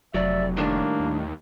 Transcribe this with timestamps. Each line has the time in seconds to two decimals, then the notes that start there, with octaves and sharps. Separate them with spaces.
0.14 F1 F#3 D5 E5
0.57 A2 D#3 G3 A#3 D4
1.00 D#2